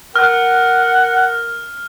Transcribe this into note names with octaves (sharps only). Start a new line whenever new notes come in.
A#4 F#5 F6